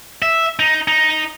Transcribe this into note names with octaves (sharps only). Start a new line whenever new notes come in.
E5
D#4
D#4